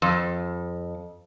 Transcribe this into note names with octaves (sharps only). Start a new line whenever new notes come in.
F2